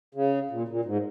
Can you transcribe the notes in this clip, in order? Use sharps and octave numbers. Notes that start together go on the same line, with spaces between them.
C#3
A#2
A#2
G#2